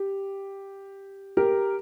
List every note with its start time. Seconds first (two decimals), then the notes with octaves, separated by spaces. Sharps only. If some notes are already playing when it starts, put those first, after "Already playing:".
Already playing: G4
1.37 G4 A#4